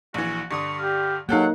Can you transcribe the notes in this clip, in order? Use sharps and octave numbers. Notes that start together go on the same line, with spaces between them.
A#1 E3 F#4
G2 D3 C#6 D#6
G4 F5
F#3 A#3 D#4 G4 A4 F5 F#5